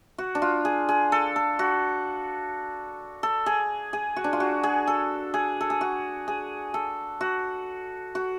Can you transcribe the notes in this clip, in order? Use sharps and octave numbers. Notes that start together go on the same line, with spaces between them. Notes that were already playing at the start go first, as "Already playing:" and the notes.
F#4
D4
F4
G#4
G#4
A4
A4
F#4
A4
G#4
G#4
F#4
D4
F4
F#4
G#4
A4
G#4
A4
G#4
F#4
G#4
A4
F#4
F#4